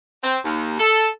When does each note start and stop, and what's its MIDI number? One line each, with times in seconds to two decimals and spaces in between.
0.24 0.39 60
0.45 0.78 39
0.80 1.08 69